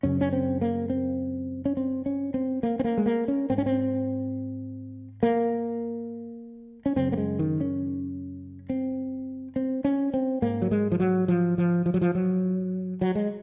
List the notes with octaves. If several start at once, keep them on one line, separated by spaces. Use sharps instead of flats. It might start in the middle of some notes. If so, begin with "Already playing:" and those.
F#2 C#3 C#4
C#4
C4
A#3
C4
C#4
C4
C#4
C4
A#3
C4
A#3
G#3
A#3
C#4
G#2 C4
C#4
C4
A#3
C#4
F#2 C#3 C4
A#3
G#3
D#3
C#4
C4
C4
C#4
C4
G#2 A#3
F#3
G#3
F3
F#3
F3
F3
F3
F#3
F3
F#3
F#3
G#3